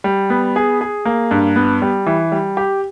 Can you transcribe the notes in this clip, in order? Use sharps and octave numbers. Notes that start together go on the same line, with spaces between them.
G3
B3
G#4
G#4
A#3
G2
B3
G3
E3
G3
G4